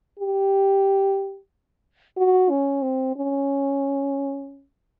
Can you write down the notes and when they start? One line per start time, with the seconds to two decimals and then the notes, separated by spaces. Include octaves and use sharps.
0.19 G4
2.17 F#4
2.50 C#4
2.82 C4
3.16 C#4